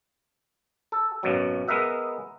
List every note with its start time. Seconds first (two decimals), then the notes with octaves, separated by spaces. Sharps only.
0.92 A4
1.23 G#1 F#2 B2 F#3
1.68 G#3 B3 A#4 D#5 E5 F#5